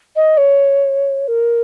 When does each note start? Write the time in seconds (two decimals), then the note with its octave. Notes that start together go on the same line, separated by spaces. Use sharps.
0.16 D#5
0.37 C#5
1.28 A#4